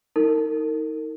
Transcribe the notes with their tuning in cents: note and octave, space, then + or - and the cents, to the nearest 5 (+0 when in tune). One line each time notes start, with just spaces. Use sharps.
D#4 +25 A#4 -35